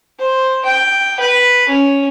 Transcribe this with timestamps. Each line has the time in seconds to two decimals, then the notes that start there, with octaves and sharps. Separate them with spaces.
0.19 C5
0.65 G5
1.20 B4
1.69 C#4